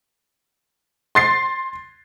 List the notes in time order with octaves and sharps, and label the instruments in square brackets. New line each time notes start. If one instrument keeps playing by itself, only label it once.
[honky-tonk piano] C6 A6 C7